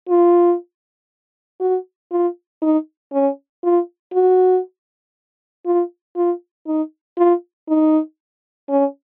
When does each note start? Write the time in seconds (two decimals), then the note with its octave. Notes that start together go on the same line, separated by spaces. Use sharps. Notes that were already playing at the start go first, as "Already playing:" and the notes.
0.09 F4
1.61 F#4
2.11 F4
2.62 D#4
3.13 C#4
3.63 F4
4.14 F#4
5.66 F4
6.16 F4
6.67 D#4
7.18 F4
7.68 D#4
8.69 C#4